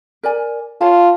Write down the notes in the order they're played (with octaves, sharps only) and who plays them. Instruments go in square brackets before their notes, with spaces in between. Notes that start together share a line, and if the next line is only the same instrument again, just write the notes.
[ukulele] A#4 D5 G#5
[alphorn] F4 [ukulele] C#5 F5 A5